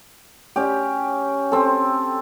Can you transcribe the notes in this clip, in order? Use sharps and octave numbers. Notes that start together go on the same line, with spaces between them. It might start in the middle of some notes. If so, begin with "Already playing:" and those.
C#4 G4
C4 A4